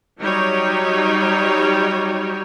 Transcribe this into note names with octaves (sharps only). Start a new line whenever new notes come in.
F#3 G3 D#4 F#4 C#5